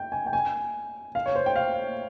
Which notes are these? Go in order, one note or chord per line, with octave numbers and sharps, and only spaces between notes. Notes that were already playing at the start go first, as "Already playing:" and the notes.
Already playing: G5
G#5
G5
G#5
F5
C#5
C5
G5
F5